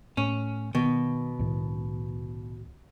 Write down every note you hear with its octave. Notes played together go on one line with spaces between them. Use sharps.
A2 C#4
B2 D#3
C2 A2 D#3